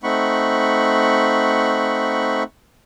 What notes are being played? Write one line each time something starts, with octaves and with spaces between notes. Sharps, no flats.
A3 C4 D#4 F#5 B5 C#6